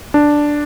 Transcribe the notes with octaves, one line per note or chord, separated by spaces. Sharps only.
D4